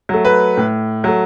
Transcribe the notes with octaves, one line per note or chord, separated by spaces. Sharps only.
F#3 A3
B4
A2
F#3 A3